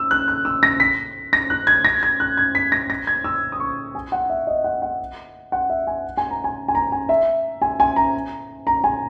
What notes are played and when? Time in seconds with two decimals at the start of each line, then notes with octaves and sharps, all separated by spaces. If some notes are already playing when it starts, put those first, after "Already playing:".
Already playing: E6
0.11 F#6
0.28 F#6
0.45 E6
0.63 A#6
0.80 B6
1.33 A#6
1.50 F#6
1.67 G#6
1.85 A#6
2.03 G#6
2.20 F#6
2.37 G#6
2.55 B6
2.72 A#6
2.90 A#6
3.07 G#6
3.24 E6
3.52 D#6
3.60 C#6
3.95 G#5
4.12 F#5
4.30 E5
4.47 D#5
4.64 F#5
4.82 F#5
5.52 F#5
5.70 E5
5.87 G#5
6.17 G#5
6.31 A#5
6.44 G#5
6.68 G#5
6.75 A#5
6.92 G#5
7.09 E5
7.62 G#5
7.80 G#5
7.96 A#5
8.67 A#5
8.84 G#5